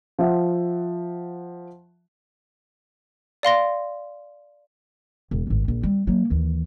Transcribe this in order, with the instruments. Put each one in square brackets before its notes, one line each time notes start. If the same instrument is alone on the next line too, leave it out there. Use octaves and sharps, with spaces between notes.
[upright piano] F3 E5 F#5
[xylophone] D5 F5 C6 A#6
[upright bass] E1
G#1 A2
A#1
G3 C4
F#3 A#3
D#2 E3